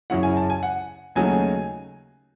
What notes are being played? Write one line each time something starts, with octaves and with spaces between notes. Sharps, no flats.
F#2 C#3 F#3 C#4 E4 F#5
G#5
A5
G#5
F#5
D#2 C#3 F#3 A3 D#4 G#5